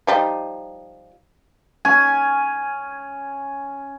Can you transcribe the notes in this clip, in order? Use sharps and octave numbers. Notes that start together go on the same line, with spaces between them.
F3 G3 D#4
C#4 G#5